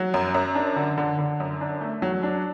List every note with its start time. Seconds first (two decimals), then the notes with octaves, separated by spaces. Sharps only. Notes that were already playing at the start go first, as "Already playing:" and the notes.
Already playing: F#3
0.14 F#2
0.34 F#2
0.55 D4
0.76 D3
0.98 D3
1.18 D3
1.40 F#2
1.61 D4
1.81 A3
2.02 F#3
2.23 D4